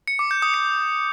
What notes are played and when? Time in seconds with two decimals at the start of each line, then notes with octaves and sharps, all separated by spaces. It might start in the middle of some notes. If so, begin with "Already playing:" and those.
0.08 C#7
0.19 D6
0.31 G6
0.42 D#6
0.54 C#7